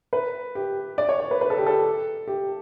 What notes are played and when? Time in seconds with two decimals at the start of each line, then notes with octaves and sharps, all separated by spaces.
0.13 B4
0.55 G4
0.98 D5
1.09 C#5
1.20 C#5
1.31 B4
1.41 B4
1.50 A4
1.58 G4
1.66 A4
2.28 G4